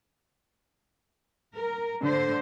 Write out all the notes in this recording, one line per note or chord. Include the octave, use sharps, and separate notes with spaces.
A#4
D3 C5